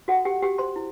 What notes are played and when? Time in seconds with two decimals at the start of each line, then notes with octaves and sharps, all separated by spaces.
0.08 F#4 A4 F#5
0.25 G4 G5
0.42 F#4 G4 G5
0.58 C5 C6
0.76 E4